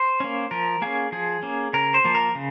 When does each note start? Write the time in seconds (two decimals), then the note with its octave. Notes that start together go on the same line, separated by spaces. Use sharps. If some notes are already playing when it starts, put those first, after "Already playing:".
Already playing: C5
0.20 A#3 C#4
0.51 F3 A#4
0.82 A#3 C#4 G#4
1.12 F3 G#4
1.43 A#3 C#4
1.73 C#3 A#4
1.94 C5
2.04 F3 A#3
2.15 A#4
2.35 C#3